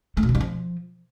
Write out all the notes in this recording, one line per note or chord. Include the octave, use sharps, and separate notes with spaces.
A3
B2
D3
G3
F3